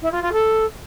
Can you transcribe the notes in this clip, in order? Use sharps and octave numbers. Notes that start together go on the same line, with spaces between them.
E4
F4
F4
A4